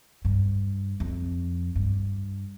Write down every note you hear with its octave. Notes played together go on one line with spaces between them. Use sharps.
G2
F2
G2